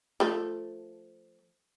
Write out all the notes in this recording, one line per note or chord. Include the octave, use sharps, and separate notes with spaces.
F3 A3